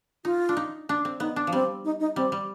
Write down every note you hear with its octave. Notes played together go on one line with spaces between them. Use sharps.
D#4 F4
D4
D#4
D4
C4
B3 D#4
D4
F3
G3 C4
D#4
D#4
G3 C4
G3